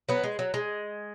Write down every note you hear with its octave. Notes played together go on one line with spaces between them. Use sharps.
F#3 B3
G#3
F#3
G#3